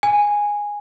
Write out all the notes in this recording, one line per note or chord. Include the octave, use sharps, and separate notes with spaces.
G#5